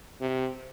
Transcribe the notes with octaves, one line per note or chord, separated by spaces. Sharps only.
C3